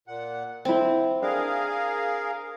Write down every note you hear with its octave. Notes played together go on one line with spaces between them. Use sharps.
A#2 F#5
D3 C4 E4 G5
D4 G#4 A#4 F5